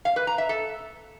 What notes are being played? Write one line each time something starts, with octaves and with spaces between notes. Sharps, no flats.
F5
B4
A#5
E5
A4